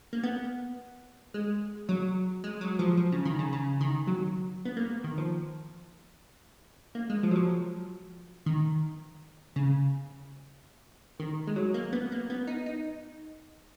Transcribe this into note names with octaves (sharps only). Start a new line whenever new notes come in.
A#3
B3
G#3
F#3
G#3
F#3
F3
F3
C#3
D#3
C#3
C#3
D#3
F#3
B3
A#3
D#3
F3
A#3
G#3
F3
F#3
F3
D#3
C#3
D#3
G#3
F#3
A#3
B3
A#3
B3
D#4
D#4